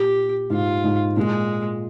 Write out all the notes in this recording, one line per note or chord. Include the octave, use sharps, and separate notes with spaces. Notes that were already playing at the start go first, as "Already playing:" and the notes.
Already playing: A#2 G4
G#2 F4
G#2
A#2 G#3